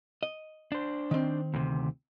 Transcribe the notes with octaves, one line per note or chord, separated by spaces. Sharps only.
D#5
D4 C5
D#3 C4
D2 C3